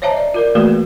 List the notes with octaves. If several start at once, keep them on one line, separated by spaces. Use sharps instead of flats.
C5 C#5 D#5 E5 A5 A#5
D5
F4 A#4 D5
E3 A3 A#3 F#4 G#4 B4